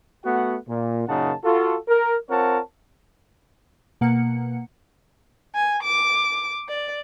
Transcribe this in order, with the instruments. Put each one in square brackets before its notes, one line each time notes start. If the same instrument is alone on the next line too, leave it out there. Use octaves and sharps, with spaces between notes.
[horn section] A3 B3 F#4 F#5
A#2
F#2 A#2 C#3 D#4 F#5 A5
F4 F#4 A4
A#4
C4 F4 A#4 C#5 F#5 A5
[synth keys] B2 A#3 F#5 C#7
[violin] G#5
D6
D5